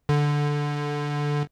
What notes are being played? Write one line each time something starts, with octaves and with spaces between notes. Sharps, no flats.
D3